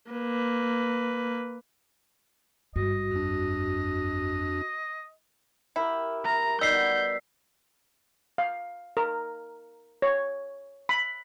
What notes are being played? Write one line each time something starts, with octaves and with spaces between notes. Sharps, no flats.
A#3 B4
G#1 G2 F#4 D#5
F2 D4
E4 G4 A#4
A#4 A#5
B2 G3 D#4 E6 G6 B6 C7
F5
A#4
C#5
B5